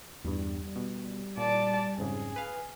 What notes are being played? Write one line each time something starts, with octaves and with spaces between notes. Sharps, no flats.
E2 G2 G3
B2
A#2 D5 A5
F2 G#2 C#3 G#4
B4 F5